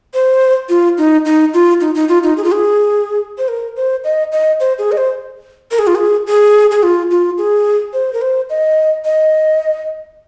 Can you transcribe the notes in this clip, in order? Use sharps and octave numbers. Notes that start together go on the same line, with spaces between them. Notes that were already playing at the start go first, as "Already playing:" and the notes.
C5
F4
D#4
D#4
F4
D#4
D#4
F4
D#4
G#4
F4
G#4
C5
A#4
C5
D#5
D#5
C5
G#4
D#5
C5
A#4
G#4
F4
G#4
G#4
G#4
F4
F4
G#4
C5
A#4
C5
D#5
D#5